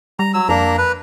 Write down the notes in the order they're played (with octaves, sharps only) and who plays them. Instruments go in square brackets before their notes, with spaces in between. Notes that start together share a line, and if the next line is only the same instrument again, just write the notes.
[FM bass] G3 [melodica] A#5
[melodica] F#3 E6
[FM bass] F2 [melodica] A#3 D4 A#5
[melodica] B4